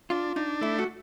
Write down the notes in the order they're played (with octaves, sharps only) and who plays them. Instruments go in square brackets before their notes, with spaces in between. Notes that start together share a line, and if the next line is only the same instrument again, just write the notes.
[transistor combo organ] D4 [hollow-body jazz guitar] F4
[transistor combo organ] D4 [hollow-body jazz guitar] D#4
[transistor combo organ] A3 [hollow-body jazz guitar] E4
[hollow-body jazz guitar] F#4